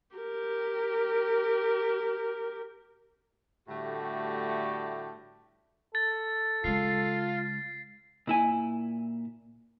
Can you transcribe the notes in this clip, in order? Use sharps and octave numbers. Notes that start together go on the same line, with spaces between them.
G4 A#4
A2 D3 G3 A3 F#4 G4
A4 A6
C#3 G#3 F4 C7
A#2 E4 G#5